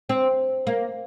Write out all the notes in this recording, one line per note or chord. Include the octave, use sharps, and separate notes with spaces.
C4
A#3